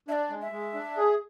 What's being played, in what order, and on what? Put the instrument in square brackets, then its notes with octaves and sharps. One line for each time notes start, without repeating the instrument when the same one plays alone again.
[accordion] D4 [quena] E5
[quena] D5
[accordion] G#3
[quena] E5
[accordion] G#3
D4
G#4